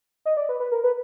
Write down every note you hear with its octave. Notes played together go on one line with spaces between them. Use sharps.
D#5
D5
B4
B4
A#4
B4